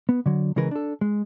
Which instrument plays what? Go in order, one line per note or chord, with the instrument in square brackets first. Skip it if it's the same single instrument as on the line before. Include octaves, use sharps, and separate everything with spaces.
[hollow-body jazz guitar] B3
D3 F#3
C#3 E3 G#3 A#4 B4
D4 A4
G#3